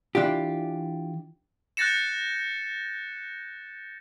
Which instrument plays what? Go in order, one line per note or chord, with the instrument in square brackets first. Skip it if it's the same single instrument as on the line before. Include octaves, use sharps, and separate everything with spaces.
[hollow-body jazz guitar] E3 D4 F4 G4
[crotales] F#6 G6 A6 A#6 C#7 E7